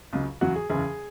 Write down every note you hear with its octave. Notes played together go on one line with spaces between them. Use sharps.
C#2 C#3 F#3
E2 C#3 F#3 F#4
G#4
F#1 E2 C#3 G#4